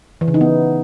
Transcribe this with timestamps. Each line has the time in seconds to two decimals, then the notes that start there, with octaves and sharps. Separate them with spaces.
0.21 E3
0.28 C#3
0.34 D#4
0.41 B3